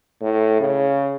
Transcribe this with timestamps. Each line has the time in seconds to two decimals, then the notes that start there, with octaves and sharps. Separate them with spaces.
0.22 A2
0.61 C#3